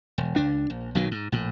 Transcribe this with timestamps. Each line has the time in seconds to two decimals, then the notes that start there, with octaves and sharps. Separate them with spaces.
0.18 E1
0.36 C#2 D4
0.70 A#1
0.95 B1 B2 D#3 F#3
1.11 G#2
1.32 A#1 A2